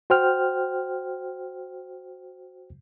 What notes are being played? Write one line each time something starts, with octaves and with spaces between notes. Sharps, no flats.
F#4 C5 G5 F6